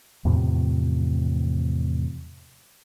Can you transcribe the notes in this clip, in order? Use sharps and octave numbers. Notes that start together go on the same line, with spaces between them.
E2 A2 C3 F3